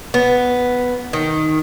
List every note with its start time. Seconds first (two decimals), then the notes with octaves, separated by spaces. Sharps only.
0.14 B3
1.13 D#3